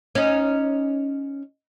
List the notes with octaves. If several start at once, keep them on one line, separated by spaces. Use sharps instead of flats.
C#4 D#4